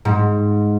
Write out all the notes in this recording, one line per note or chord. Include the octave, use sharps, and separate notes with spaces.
G#2